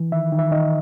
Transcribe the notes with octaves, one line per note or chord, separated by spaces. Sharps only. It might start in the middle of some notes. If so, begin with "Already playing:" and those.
Already playing: E3
D#3 E5
D#3
E5
D#3 D#5